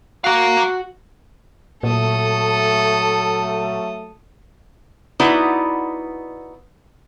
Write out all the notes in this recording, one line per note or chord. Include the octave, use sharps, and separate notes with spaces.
F#4 A#4 F5
A#2 F#3 A3 A4 D#6
B3 D#4 E4 F#4 B4 D5